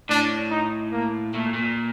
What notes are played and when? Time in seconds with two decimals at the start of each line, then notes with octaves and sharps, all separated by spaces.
0.09 A2 D4
0.51 D#4
0.92 A#3
1.34 A#2 A3
1.54 A#2